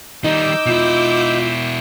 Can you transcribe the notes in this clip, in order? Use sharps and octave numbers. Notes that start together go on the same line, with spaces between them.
D#3 G3 D#4 D6 E6 G6
B2 E4 F4